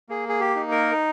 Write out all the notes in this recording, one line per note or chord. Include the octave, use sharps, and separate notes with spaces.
A#3 G#4
G#4
G4
D#4
A#4